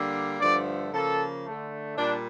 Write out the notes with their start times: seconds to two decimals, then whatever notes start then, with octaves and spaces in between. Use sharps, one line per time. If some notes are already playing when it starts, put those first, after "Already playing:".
Already playing: D3 G3 A#3
0.41 G2 D3 F3 A3 D5
0.93 C#3 F3 A#3 A4
1.46 D3 A3
1.97 A#2 G3 D4